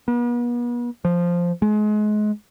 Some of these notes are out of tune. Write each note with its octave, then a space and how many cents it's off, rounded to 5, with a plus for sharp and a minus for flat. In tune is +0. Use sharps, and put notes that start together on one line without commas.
B3 -40
F3 -5
G#3 +30